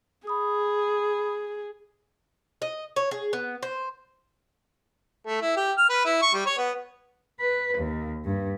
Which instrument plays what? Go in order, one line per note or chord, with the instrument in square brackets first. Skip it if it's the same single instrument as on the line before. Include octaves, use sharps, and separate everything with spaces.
[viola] G#4 [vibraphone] B5 D#6
[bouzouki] D#5
C#5
G#4
B3
C5
[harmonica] A3
E4
G4
F6
B4
E4
C#6
G3
C#5
B3
[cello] B4
D#2
G2